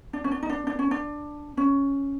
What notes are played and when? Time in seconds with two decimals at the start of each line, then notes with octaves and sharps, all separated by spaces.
0.13 D4
0.24 C#4
0.31 D4
0.43 D#4
0.50 D4
0.67 D4
0.79 C#4
0.91 D4
1.57 C#4